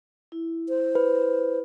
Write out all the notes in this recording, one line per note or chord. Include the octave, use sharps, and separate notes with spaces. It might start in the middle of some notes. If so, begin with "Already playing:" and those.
E4
C5
B4